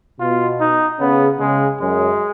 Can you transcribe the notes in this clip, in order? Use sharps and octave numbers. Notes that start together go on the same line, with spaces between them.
B2 F4
D#4
C#3 B3
C#3 G#3
F#2 G#3